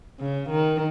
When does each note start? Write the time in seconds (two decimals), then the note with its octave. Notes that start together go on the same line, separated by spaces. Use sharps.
0.20 C#3
0.50 D#3